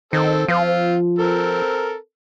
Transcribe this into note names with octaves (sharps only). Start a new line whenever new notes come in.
D#3 C4 A4
F3 C4 F4
C4 A4 A#4